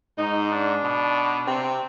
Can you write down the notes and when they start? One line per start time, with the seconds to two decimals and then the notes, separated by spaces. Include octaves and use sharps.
0.18 G#2 D#4
0.51 D4
0.84 B2
1.48 C3 C4